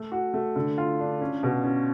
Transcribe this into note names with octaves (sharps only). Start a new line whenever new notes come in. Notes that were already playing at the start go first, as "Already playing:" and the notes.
Already playing: A3
F#4
A3
D3
F4
D4
C#4
B2
C#4